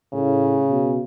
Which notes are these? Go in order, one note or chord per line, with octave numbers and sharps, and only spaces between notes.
A2 C#3
B2